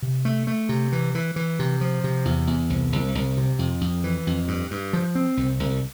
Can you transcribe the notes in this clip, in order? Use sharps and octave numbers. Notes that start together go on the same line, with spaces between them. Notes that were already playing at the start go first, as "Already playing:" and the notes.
C3
A3
A3
C3
E3
E3
E3
C3
F3
C3
E2
E2
C2
C2
C2
C3
F2
F2
E3
F2
G2
G2
F3
C4
C2
C2